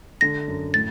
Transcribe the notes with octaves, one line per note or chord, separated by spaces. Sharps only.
D3 A#6
F#2
A2 A6